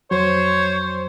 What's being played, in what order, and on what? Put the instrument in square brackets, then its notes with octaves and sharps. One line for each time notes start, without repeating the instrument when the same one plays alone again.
[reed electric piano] F2 F#3 [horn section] C5 [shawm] C#5